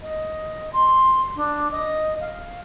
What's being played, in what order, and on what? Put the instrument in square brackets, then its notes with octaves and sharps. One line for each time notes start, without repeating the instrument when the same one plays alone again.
[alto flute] D#5
C6
D4
D#5
F5